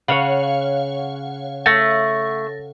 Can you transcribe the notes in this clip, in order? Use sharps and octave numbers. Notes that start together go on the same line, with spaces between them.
C#3 C#5 F5 F#5
A3 A6 A#6